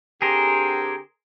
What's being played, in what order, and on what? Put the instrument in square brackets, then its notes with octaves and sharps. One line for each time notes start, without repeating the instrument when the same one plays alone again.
[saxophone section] D3 C4 G4 [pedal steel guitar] G#4 A#4 C5